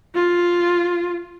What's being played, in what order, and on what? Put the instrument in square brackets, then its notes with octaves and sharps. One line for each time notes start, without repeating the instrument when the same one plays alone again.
[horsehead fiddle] F4